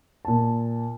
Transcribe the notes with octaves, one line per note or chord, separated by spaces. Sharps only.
A#2 A5